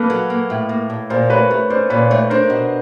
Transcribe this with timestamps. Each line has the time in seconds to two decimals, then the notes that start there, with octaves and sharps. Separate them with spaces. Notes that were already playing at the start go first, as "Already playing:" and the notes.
Already playing: A#3 A4 B4
0.10 F#3
0.30 A#3
0.50 A2
0.69 A#3
0.90 A2
1.10 A#2 A#4 C5
1.30 A3 B4 C#5
1.50 A3 B4 C#5
1.70 C#4 C5 D5
1.90 A#2 B4 C#5
2.10 A3 B4 C#5
2.30 D4 A#4 C5
2.50 B2